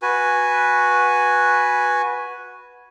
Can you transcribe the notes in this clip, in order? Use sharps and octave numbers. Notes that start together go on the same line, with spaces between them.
F#4 B4 G#5